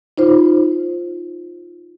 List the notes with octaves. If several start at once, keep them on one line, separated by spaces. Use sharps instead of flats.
D#4 F4 C5